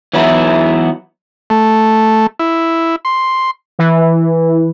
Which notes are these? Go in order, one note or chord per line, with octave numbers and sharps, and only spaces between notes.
E3 F#3 B3 D#4 E4
A3
E4
C6
E3